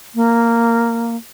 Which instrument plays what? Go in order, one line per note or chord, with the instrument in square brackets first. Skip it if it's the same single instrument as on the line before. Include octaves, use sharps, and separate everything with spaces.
[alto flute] A#3